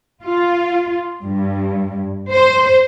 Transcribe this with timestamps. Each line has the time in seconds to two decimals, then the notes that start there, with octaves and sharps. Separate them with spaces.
0.23 F4
1.23 G2
2.31 C5